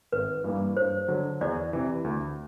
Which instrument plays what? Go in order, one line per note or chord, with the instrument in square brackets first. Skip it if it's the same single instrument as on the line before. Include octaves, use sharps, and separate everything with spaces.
[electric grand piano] G#1 [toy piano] B4
[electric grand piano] G2 E3 G3 A#3
[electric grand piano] G2 [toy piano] C5
[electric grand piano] D3 F#3
[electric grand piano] E2 [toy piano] D5
[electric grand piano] C3 E3
D2